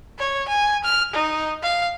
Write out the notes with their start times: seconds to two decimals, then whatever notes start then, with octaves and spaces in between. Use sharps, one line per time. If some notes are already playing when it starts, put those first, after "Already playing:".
0.19 C#5
0.48 G#5
0.84 F6
1.13 D#4
1.63 F5